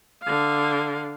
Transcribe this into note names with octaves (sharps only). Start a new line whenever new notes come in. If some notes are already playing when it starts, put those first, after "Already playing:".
D3 F5